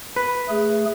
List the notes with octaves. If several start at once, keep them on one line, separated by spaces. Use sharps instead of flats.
B4
A3 G#4